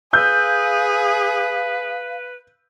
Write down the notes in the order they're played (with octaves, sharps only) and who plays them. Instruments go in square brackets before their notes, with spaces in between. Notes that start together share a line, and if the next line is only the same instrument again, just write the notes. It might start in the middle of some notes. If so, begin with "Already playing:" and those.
[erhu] G#4 [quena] B4 [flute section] F5 [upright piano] E6 G6